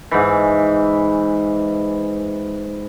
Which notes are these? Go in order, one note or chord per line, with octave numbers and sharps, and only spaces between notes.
G#2 E3